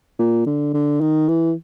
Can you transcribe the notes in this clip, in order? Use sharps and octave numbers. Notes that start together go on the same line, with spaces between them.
A#2
D3
D3
D#3
E3